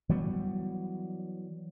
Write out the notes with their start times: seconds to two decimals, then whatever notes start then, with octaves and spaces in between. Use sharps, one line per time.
0.09 E3 F#3 G3 B3